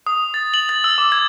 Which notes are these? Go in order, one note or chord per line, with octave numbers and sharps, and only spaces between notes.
D#6
A6
F#7
A6
E6
D6
G#6